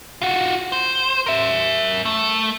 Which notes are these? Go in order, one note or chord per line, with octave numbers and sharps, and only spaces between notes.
F4 F#4
C5
A#4 E5
A3